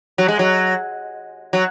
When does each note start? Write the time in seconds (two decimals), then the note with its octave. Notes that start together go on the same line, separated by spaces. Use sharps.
0.18 F#3
0.28 G#3
0.39 F#3
1.53 F#3